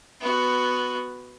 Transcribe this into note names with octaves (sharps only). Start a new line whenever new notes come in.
B3 F#4